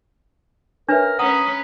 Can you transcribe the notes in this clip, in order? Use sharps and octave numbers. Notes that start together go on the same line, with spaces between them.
D4 A#4 B4 C#5 E5
C#4 B4 F#5 A#5 D#6